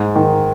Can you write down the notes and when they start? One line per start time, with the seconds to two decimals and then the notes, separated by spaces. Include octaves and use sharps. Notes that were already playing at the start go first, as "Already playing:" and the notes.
Already playing: G#2
0.16 D#3